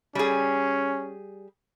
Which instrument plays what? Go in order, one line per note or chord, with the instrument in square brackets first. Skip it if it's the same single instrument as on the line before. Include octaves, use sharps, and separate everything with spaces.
[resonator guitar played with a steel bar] G3 G#4 [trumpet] C#4